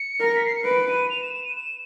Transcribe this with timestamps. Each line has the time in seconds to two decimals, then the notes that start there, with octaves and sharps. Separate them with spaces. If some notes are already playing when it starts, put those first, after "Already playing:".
Already playing: C#7
0.20 A#4
0.25 A#6
0.35 B6
0.45 C7
0.56 C#7
0.65 B4 D7
0.88 D#7
1.10 F7
1.22 E7
1.33 E7
1.45 D#7
1.56 E7